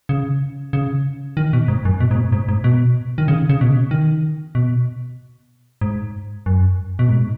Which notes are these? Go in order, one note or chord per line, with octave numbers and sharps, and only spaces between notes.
C#3
C#3
D#3
B2
G#2
F#2
B2
G#2
B2
G#2
G#2
B2
D#3
C#3
C#3
B2
C#3
D#3
B2
G#2
F#2
B2
G#2